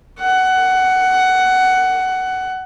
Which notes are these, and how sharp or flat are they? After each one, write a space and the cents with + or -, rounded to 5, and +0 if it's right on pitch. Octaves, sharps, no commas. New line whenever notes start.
F#5 +15